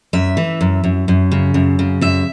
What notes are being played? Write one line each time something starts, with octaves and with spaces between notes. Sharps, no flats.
F#2 E5
E3
F#2
F#2
F#2
C#3
F#2
C#3
F#2 E5